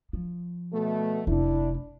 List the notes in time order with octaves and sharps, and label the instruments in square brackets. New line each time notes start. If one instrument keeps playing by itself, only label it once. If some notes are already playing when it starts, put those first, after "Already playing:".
[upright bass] F3
[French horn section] B2 A3
[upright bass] F1 [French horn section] D4 E4